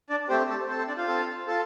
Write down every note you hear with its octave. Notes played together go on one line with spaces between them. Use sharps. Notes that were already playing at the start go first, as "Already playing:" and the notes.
D4 D5
A3 C4 G4 C5
A4
C4 A4 C5
C5
D4 D5
F4 F5
C4 A4
F4 A4